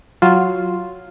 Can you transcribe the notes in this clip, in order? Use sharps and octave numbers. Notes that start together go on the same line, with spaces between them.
F#3 F4